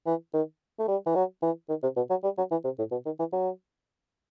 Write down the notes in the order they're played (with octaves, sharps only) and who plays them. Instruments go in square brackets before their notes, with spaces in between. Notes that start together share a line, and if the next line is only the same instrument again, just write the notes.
[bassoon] E3
D#3
A3
G3
E3
F#3
E3
D#3
C3
B2
F#3
G3
F#3
E3
C3
A2
B2
D#3
E3
F#3